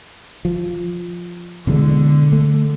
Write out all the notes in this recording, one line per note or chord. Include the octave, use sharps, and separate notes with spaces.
F3
B2 D3 E3 G#3
A3